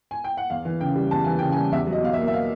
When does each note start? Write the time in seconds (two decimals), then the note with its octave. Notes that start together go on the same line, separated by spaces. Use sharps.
0.11 G#5
0.24 G5
0.37 F#5
0.50 E2 F5
0.65 E3
0.81 C#3 G5
0.96 G3
1.11 E2 A5
1.24 E3 G#5
1.39 C#3 G5
1.52 G#5
1.56 G3
1.72 E2 E5
1.87 F#3
1.92 D#5
2.02 B2 F5
2.13 E5
2.18 A#3
2.28 E5
2.33 F5